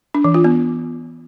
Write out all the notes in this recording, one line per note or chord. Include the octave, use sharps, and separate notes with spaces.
D4
E3
F4
B3